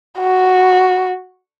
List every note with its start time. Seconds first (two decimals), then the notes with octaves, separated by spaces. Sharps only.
0.19 F#4